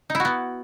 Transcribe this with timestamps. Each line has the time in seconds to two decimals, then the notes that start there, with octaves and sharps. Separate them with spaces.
0.10 D#4
0.15 E4
0.20 F#4
0.25 B3